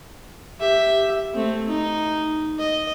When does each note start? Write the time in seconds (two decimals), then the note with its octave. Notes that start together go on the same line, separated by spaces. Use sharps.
0.60 G4 E5
1.34 A3 C4
1.68 D#4
2.59 D#5